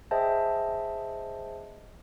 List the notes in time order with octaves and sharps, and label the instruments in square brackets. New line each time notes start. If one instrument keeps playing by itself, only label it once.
[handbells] G#4 C5 D#5 E5 G5 A5